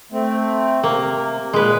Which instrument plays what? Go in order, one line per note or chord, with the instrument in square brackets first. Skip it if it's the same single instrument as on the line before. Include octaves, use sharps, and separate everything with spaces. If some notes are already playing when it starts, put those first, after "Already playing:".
[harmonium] A3 C4
[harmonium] C3 [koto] A#3
[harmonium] A#2 [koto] G#3 B4